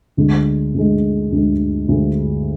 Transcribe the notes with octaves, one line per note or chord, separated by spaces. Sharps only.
D2 D3 G#3
D2 D3 G#3
D2 D3 G#3
D2 D3 G#3